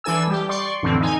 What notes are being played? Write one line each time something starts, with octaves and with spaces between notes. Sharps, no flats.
E3 D4 A4 G#5 E6
G3 G4
D5 C6 C#6
F2 A2 D3 E3 C4
D#4 G#5